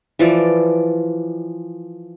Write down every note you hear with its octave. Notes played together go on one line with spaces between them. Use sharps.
E3 F3 D5